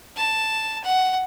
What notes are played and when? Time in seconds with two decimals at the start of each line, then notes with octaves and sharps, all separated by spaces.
0.17 A5
0.84 F#5